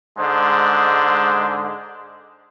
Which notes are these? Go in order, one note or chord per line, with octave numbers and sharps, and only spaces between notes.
G#2 D3 G#3 C5